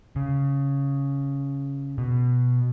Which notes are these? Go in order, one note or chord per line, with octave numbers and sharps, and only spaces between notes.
C#3
B2